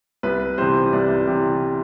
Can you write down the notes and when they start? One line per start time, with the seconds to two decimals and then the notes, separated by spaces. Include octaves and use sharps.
0.23 C2 B4
0.58 C3 E3 G3 C5
0.93 C2 D5
1.27 C3 E3